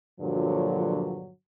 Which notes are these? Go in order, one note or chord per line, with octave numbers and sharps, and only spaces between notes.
G2 A#2 D3 F3 F#3